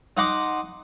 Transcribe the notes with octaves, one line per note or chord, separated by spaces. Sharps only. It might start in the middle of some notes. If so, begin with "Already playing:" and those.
D#4 D#5 F#5 C6 D6